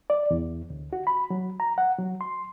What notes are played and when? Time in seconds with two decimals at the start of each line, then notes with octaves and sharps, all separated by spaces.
0.10 D5
0.31 E2
0.70 D2
0.93 F#4
1.07 B5
1.30 F#3
1.60 A#5
1.78 F#5
1.99 F#3
2.21 C6